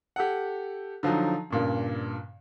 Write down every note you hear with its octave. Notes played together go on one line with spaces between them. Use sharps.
G4 A4 F#5
D3 F3 F#3 D#4
G2 A#2 C#3